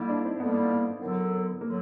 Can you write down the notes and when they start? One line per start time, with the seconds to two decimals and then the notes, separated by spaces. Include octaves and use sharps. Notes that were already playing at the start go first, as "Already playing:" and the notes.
Already playing: D3 G3 A#3 D#4 E4
0.09 D4
0.25 C4
0.39 D3 G3 A#3 B3
0.70 B3
1.01 F#2 D3 F#3
1.61 D3 F#3 A#3